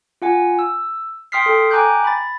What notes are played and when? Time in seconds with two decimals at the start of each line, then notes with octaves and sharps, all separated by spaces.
0.22 F4 F#5 G#5
0.59 E6
1.32 G5 C6 D#6 F6 B6 C7
1.46 A4 G5
1.71 G5 G#5 A#5 D6 F#6 G6
2.04 B5 A6